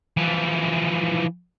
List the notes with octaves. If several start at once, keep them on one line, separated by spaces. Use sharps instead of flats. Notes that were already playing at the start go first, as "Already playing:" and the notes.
E3 F3